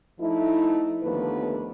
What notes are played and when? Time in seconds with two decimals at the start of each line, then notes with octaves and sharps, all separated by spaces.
0.19 F3 A3 D#4 E4
1.03 D#2 D3 F3 A3 B3 B4